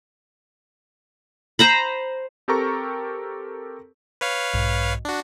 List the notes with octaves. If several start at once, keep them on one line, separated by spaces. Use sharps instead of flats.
C5 A#5 B5
C4 G4 A4 A#4 A#5 C#6
B4 C#5 F5
B1 G#2
D4 F#4